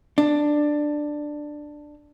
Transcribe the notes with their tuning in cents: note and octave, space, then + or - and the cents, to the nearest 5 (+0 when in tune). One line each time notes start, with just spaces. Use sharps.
D4 +10